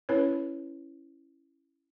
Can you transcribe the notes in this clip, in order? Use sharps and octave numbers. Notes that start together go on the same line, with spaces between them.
C#4 E4 B4 C#5